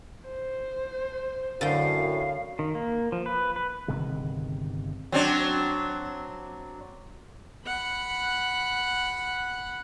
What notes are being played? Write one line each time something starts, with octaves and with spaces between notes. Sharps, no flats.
C5
F#2 A2 D3 F5 G5
D#3
A#3
F3
B4
B4
G1 C3 D#3 G#3
F#3 C4 D4
F#5 B5